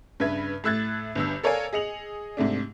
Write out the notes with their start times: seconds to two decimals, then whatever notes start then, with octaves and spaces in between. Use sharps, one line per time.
0.20 G2 C#3 B4 E5 G#6
0.64 A2 A3 E6 F#6 G#6 A6
1.15 G1 G2 E6
1.43 A4 A#4 C#5 D5 F5 G#5
1.73 G#4 D#5 C#7 F7 F#7
2.37 G#2 C3 A3 D4